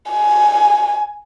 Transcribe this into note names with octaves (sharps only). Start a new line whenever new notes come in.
G#5